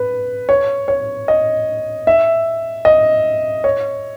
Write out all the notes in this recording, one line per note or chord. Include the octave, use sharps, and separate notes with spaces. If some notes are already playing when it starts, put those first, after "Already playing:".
Already playing: B4
C#5
C#5
D#5
E5
D#5
C#5